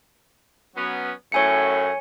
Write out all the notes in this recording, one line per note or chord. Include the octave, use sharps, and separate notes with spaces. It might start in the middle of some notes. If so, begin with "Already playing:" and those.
F#3 B3 C#4
F#2 A2 A3 C#5 G#5 C#7